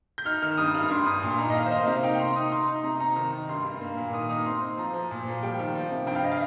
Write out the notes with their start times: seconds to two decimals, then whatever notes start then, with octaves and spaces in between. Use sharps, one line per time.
0.18 G6
0.25 D#4 F6
0.42 D#3 F6
0.57 G2 D#6
0.74 G2 F6
0.90 G2 C6
1.06 G2 D#6
1.22 A#2 C6
1.38 D#4 A#5
1.50 D#5
1.55 D#3 F5
1.66 C5
1.71 A#3 D#5
1.87 C3 F5
2.03 D#4 G5
2.19 D#4 C6
2.36 D#4 D#6
2.52 D#4 C6
2.68 D#4
2.84 C3 A#5
3.00 D#4 A#5
3.16 D#3
3.32 D#3
3.49 G2 C6
3.65 G2
3.81 A#3
3.97 A#2
4.13 D#3 D#6
4.29 D#4 D#6
4.46 C4 C6
4.61 C4
4.77 F3 A#5
4.94 F3
5.11 A#2
5.27 F3
5.43 G3 G5
5.59 D#3 G5
5.75 F3
5.91 C3
6.07 G2 G5
6.15 F5
6.24 D#5
6.32 F5